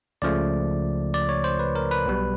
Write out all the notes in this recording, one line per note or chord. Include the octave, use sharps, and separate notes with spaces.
C#2 C#3 F3 A3 D5
D5
C#5
C5
B4
A#4
B4
B1 B2 G3